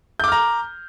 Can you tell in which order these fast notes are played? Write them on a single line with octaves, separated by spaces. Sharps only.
G6 D6 F6 A#5